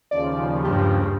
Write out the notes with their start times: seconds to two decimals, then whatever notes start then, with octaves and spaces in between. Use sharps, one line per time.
0.11 D#2 C#3 F3 D5
0.64 G2 G4